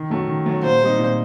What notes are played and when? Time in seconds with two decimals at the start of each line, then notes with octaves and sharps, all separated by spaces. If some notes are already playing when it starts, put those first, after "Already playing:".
Already playing: D#3
0.10 F#3 A3 C#4 F#4
0.27 D#3
0.46 F#3 A3 C#4 F#4
0.63 A#2 C5
0.81 G3 C4 D#4
0.99 A#2